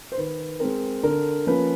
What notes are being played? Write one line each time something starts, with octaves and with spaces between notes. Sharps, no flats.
C5
D#3 B4
G#3 C4 A#4
D3 A#4
F3 A#3 C#4 B4